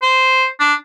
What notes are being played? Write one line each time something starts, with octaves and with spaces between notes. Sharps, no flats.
C5
D4